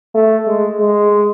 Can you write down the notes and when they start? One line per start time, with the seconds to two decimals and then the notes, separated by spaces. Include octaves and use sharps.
0.14 A3
0.47 G#3
0.80 G#3